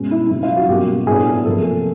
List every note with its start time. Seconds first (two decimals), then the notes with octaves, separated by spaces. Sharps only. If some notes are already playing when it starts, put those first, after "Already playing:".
Already playing: B2 G#3 C#4
0.11 E4
0.30 F#2 C#3 F#3 E4
0.43 F4
0.56 F#4
0.68 B2 G3 A#3 C#4 G4
1.07 A2 F#3 B3 D4 G#4
1.45 C3 F3 A#3 A4